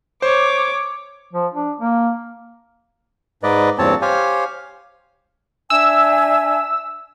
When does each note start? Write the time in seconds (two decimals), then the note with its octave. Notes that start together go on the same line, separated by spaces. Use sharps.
0.22 C5 C#5 D6
1.33 F3
1.54 D4
1.81 A#3
3.43 G#2 B4 D5 D#5
3.79 E2 G2 A#2 C4 C#5 A5
4.02 G4 C5 C#5 F5 G#5
5.70 D4 E5 G#5 E6